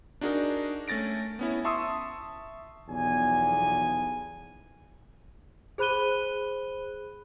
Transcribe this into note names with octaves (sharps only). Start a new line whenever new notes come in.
D4 D#4 F#4 G#4 A#4
A3 C#4 A6 A#6 D7
B3 C#4 E4
E5 A5 C6 C#6 D#6 E6
B1 E2 F3 G#5
G#4 C5 B5 F#6 D#7 G7